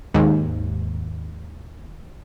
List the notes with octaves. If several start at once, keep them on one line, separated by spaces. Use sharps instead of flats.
D#2 G#2